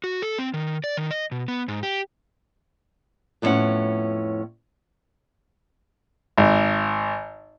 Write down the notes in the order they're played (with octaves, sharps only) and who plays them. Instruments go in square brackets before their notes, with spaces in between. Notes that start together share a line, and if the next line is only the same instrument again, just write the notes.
[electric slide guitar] F#4
A4
C4
D#3
D5
D#3
D#5
B2
B3
G#2
G4
[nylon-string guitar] F2 A2 E3 B3 C#4 F#5
[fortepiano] G#1